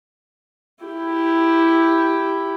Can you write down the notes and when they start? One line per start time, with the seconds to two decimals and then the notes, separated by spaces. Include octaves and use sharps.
0.83 E4 G4